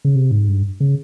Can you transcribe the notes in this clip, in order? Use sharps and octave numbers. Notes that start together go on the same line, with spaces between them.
C#3
C3
G#2
G2
C#3